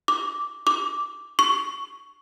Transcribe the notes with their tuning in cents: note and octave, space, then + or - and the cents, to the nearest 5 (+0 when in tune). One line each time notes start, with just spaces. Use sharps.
D6 -5
D6 -5
C#6 +10